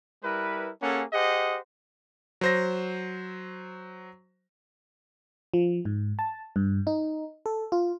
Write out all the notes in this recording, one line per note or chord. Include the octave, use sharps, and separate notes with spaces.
G3 E4 A#4 B4
A#3 C#4 G#4 A4 F#5
G4 G#4 C5 D#5 F#5
F#3 C5 A#6
F3
G#2
A5
G2
D#4
A4
F4